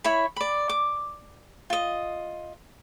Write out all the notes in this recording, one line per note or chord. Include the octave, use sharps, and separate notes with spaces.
E4 C#5 B5
D5 B5
D6
F4 D#5